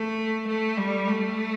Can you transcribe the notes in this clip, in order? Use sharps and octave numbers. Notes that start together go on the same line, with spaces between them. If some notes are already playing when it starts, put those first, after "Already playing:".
Already playing: A3
A3
G3
A3